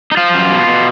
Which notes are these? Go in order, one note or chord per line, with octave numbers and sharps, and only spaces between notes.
D#4
F3 F4
F#2
B2
B2